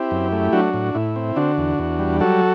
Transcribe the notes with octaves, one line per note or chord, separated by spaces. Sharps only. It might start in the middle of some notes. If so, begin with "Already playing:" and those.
Already playing: C4 E4 G4
F#2
A3
F#3 D4 F#4
A2
A2 E4
C4
D3 D4 F#4
E2
E2
G3
F#3 F#4 A4